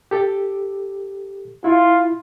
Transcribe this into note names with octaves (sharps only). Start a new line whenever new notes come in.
G4 A4
E4 F4